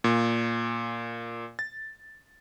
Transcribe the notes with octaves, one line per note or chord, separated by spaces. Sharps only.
A#2
A6